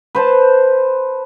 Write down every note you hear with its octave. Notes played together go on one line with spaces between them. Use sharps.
B4 C5 A5